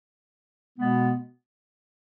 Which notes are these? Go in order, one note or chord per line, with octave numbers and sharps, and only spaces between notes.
B2 G#3 B3